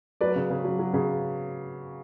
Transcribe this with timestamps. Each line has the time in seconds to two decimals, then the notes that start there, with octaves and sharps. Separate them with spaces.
0.21 F#3 B4 D5
0.36 C#3
0.50 C#3
0.64 F#3
0.79 F#3
0.93 C#3